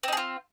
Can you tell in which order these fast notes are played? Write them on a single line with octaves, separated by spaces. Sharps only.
C4 D#4 G#4 F4